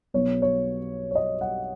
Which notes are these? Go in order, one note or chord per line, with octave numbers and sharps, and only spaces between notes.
B1 B2 F#3 C#5
C#5
C#5
D#5
F#5